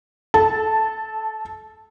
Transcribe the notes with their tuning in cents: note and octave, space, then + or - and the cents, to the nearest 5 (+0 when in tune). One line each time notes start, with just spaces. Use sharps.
A4 -20 A5 +0